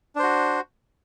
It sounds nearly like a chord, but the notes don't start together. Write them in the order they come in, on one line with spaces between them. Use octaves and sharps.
D4 C5 F#4